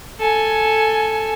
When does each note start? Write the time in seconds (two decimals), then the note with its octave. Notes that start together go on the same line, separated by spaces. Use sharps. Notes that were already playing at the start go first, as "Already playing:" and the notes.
0.20 A4 G#5